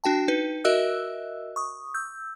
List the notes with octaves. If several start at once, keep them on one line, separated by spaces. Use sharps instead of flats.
D4 F#4 G5 A5
D#4 B4
F#4 A#4 D#5 E5 E6 F#6
C#6 D#6
E6 G6